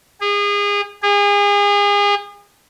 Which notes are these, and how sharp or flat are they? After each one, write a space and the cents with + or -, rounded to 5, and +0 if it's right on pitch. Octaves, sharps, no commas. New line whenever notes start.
G#4 -30
G#4 -35